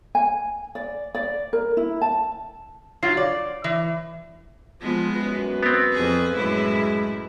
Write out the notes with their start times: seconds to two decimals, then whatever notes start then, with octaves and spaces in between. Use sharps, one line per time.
0.15 G#5
0.75 D5
1.15 D5
1.53 A#4
1.77 E4
2.02 A5
3.03 F#3 F4 C7
3.17 C#5 D5
3.64 E3
4.82 F3 G#3 B3
5.20 F#2 B4
5.63 B3 C4
5.92 F2 G#4
6.35 F#2 A2 G#3 E4